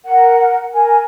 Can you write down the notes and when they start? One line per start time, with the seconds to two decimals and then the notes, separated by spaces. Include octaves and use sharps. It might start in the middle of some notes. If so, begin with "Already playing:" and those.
0.05 A#4 F#5
0.74 A#4 G#5